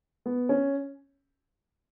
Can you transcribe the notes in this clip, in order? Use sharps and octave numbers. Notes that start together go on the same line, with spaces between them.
B3
C#4